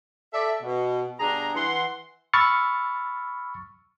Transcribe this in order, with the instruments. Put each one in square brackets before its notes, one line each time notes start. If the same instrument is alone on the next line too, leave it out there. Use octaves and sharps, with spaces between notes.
[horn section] A4 D5 E5
B2
G2 B2 D4 G#4 A#5
E3 F#5 C6
[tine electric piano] B5 C#6 E6 F6 A6 C#7